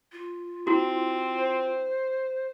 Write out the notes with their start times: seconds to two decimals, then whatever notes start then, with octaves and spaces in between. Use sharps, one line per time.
0.12 F4
0.67 C4 E4 F#4
1.37 C5